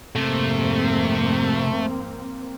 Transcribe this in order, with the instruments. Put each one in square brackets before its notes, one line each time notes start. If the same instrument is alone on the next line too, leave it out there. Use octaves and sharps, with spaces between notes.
[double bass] F2 G#2 [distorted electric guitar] C3 [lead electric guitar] A3 [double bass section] A#3 C4